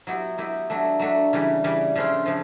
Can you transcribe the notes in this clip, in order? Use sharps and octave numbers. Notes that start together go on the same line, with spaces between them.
F#3 B3 E4 G4
F#3 B3 E4 G4
F#3 A3 D4
F#3 A3 D4
C#3 E3 G3
C#3 E3 G3
C#3 F3 A3 D4 F4
C#3 F3 A3